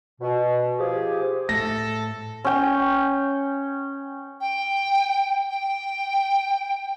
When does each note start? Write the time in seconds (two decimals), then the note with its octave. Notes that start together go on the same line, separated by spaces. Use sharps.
0.21 B2
0.79 F3 G4 G#4
1.49 A2 A3 A4 A#6
2.45 C#4 G5
4.41 G5
5.50 G5